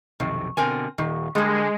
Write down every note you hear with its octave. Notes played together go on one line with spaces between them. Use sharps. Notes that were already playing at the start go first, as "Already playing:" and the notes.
B1 F2 C3 D#3
B2 D3 C4 A#4 G#5
D#1 D#3
D3 G3 G#3 A#3